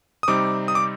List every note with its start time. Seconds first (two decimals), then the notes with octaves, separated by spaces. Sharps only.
0.23 D#6
0.28 C3 G3 C4 D#4 D6
0.68 D#6
0.75 D6